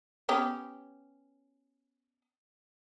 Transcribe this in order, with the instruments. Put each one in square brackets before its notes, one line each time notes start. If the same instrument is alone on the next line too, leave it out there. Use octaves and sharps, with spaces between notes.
[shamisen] B3 C#4 G4